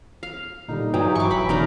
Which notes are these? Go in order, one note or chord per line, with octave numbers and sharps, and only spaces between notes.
F5
A#2 D3 G3 D#4
G2 F#3 G5 G#5 D#6
E3 E4 C#6 D6
E1 B5
B2 D#3 D4 D#4 A#4